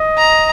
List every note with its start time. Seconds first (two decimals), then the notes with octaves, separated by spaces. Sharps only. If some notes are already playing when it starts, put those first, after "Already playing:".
Already playing: D#5
0.18 A#5